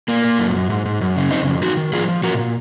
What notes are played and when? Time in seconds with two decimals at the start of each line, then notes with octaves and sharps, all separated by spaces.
0.08 A#2 A#3
0.24 A#2
0.39 F#2
0.55 F#2
0.70 G#2
0.86 G#2
1.01 F#2
1.17 C#3
1.31 F2 C4 D#4
1.47 F2
1.62 D#3 D#4 F#4
1.77 D#3
1.93 F3 F4 G#4
2.08 F3
2.23 A#2 F#4 A#4
2.39 A#2